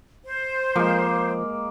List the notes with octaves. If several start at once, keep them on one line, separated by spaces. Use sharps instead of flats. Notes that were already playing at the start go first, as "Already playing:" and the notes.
C5
F3 G#3 A#3